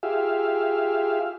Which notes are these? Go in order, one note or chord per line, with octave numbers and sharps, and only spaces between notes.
F4 G4 G#4 E5 F5